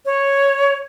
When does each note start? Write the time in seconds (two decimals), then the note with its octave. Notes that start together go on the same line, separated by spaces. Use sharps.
0.05 C#5